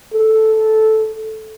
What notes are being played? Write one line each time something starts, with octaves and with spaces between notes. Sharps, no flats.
A4